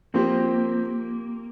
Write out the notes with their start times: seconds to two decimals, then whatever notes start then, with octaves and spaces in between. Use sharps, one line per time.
0.14 F3 A#3 C4 G4 C5